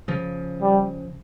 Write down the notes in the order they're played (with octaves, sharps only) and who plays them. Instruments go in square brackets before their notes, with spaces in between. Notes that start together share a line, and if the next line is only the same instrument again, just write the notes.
[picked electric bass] C#3 F3
[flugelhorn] G3